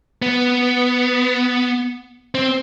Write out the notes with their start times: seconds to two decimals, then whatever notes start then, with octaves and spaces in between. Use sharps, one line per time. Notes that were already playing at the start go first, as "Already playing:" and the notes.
0.22 B3
2.35 C4